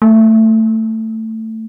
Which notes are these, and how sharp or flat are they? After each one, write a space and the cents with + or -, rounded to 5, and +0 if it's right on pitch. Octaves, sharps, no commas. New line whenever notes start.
A3 +15